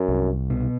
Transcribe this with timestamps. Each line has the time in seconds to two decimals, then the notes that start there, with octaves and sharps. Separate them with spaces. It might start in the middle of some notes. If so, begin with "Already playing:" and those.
Already playing: F#2
0.08 C2
0.50 B2